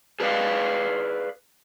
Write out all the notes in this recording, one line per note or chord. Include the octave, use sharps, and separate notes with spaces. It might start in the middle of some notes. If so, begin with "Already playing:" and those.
G#4 B4 D5 F5